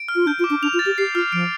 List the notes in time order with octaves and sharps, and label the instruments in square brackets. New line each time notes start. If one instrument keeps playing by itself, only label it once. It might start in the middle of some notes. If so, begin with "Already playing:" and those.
Already playing: [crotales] D7
F6
[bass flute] F4
[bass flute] D4 [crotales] G6
[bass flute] F4
[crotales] D6
[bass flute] D4
[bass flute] D4 [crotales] F7
[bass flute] F4
[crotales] A6
[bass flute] G4
[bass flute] G4 [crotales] C7
[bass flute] F4 [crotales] F6
[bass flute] F3 [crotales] D7